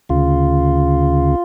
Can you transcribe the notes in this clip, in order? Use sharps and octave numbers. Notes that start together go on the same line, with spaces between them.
D2 C#3 F4